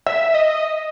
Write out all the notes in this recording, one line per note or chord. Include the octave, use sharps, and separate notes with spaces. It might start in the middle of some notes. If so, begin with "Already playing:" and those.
E5
D#5